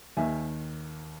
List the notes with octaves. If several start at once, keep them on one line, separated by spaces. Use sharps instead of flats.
D#2 D#3 E5 G#5